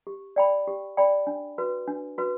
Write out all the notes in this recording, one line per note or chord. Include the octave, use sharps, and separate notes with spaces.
G4
D5 G5 B5
G4
D5 G5 B5
D4
F#4 B4
D4
F#4 B4